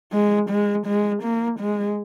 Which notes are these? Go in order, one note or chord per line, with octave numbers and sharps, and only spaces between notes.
G#3
G#3
G#3
A#3
G#3